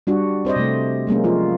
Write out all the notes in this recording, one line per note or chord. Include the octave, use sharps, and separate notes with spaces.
G3 D4 F#4
C4 C5 D5 D#5
C3 A3
F#3 G#3 A#3 C#4
F3 F4